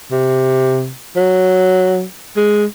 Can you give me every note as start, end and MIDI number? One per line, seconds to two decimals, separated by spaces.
0.11 0.92 48
1.16 2.04 54
2.36 2.65 56